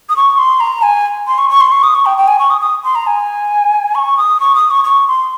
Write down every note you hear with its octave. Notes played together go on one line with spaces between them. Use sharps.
D#6
C#6
C6
A#5
G#5
C6
C#6
C#6
C6
C#6
D#6
C#6
G5
G5
G#5
C#6
D#6
D#6
C6
A#5
G#5
C#6
D#6
C#6
D#6
C#6
C#6
C6